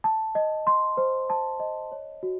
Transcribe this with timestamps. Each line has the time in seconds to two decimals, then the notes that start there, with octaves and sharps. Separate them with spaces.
0.04 A5
0.35 D#5
0.67 C6
0.97 C5
1.30 A5
1.60 D#5
1.92 C#5
2.23 F#4